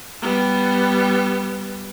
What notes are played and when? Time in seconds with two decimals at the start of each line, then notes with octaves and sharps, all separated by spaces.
0.22 G3 B3